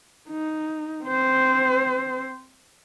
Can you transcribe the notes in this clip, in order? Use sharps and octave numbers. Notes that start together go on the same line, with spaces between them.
D#4
C4 C5